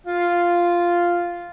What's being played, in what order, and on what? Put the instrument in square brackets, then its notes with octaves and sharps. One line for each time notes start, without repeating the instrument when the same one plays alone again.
[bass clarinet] F4